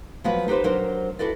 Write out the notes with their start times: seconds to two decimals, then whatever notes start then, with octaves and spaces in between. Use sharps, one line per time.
0.24 F3 F#3 B3 F#4 B4
0.48 D#4 G4 B4 C5
0.64 F#3 D4 A#4 C5
1.19 E4 F#4 A4 B4 D5